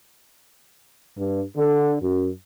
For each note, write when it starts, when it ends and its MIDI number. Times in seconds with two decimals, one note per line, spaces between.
1.17 1.41 43
1.57 1.96 50
2.02 2.29 42